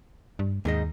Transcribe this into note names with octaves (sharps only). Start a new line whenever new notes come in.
G2
D#2 G#2 D#3 D#5